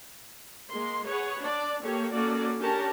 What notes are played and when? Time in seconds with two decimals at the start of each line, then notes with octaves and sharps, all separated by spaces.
0.70 G#3 A#3 C6
1.06 G#4 B4 C#5 F#5
1.40 D4 D5
1.84 A#3 G4 A4 C#5
2.13 A#3 C#4 F#4 A4 D5
2.59 C#4 D4 G4 A#4 C#5 A5